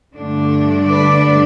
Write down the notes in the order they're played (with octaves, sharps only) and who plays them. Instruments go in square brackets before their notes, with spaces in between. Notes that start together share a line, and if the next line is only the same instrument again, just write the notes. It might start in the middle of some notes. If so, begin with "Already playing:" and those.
[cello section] G2 D3 A3 D4
B4 D5